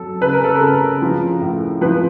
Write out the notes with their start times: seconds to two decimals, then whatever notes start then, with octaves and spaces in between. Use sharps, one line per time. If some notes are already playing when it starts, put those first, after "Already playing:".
Already playing: F#3 A4
0.21 C#3 B4
0.33 A#4
0.44 A4
0.56 A#4
0.62 C#3
1.02 F3
1.41 A2
1.81 F3 B4